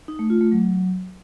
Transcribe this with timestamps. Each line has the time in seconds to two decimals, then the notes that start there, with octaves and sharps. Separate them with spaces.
0.08 D#4
0.19 A3
0.30 F4
0.41 A3
0.52 F#3